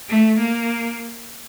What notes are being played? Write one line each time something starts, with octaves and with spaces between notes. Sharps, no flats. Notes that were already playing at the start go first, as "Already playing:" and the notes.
A3
A#3